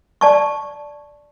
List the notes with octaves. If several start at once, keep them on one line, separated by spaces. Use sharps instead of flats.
D5 A5 C#6